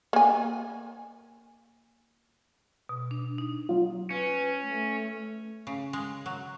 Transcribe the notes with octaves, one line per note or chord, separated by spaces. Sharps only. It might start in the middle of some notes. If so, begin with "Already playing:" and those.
A#3 G#5
B2
D4
D#4
F#3 F4
C#4 B4
A3
C#3
G#3
F#3